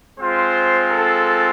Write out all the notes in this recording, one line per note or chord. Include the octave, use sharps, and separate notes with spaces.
G#3 C4 F4 C5
A4